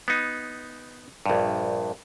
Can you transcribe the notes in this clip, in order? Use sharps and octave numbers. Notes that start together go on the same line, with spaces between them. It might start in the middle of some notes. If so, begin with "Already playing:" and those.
B3 D#4
A#1 G2